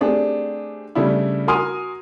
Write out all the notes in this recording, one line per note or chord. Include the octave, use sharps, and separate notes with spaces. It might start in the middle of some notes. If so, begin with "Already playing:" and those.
A3 C4 D4 G4 G#4
C#3 G3 A3 D4 E4
F#4 A#4 G#5 C6 D#6 F6